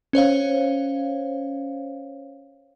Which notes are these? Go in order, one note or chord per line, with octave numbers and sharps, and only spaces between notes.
C#4 C5 C#5 F5